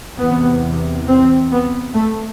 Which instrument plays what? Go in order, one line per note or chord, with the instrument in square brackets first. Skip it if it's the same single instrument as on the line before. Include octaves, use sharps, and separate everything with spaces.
[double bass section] E2 C3 B3
C4
B3
A3